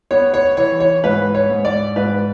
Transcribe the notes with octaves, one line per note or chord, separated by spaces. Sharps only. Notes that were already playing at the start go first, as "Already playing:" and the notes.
B3 C#5
C#5
E3 C#5
C#5
G#2 B4
C#5
G#2
D5
G#2 B4